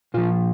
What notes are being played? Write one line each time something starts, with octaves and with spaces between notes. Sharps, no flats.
A#2 F3 F4